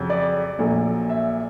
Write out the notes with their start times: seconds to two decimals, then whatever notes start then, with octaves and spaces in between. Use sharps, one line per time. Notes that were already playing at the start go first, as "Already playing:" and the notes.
Already playing: F2 C#3 F#3
0.10 D5
0.59 A#1 A#2 F#3 A3
1.09 E5